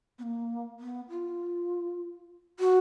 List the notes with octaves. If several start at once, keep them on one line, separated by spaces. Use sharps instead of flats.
B3
A#3
B3
F4
F#4